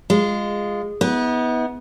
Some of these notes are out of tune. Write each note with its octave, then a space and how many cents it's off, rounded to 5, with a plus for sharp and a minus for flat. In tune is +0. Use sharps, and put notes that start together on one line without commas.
G#3 -15 F4 +0
B3 +0 E4 -45